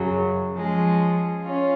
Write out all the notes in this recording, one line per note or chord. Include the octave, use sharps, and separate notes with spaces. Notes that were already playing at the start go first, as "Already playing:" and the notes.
Already playing: F#2 C#3 F#3
F3 G#3 C#4
C#4 F4